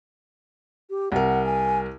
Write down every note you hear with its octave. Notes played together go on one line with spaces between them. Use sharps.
G4
C2 A#4 F#5
G#5